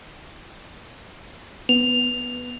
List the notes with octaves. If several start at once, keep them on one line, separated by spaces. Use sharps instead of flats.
B3 F7